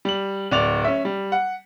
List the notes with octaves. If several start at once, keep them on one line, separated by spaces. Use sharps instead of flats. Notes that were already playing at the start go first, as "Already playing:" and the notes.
G3 F#7
D1 D5 F7
C#4 E5
G3
F#5